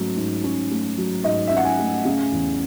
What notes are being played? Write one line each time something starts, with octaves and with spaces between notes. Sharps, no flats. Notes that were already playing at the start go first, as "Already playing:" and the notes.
Already playing: G#2 F#3 A3 C#4
G#2
C#4
A3
F#3
G#2 D#5
E5
C#4
F#5
G#5
A3
C#3
E2